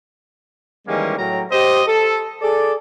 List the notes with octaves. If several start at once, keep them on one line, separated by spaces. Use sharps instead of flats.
D#3 E3 G3 G#3 A#3 C#4
A2 F#3 G5 A#5
G4 C5 D#5
A4
G#4 A4 D5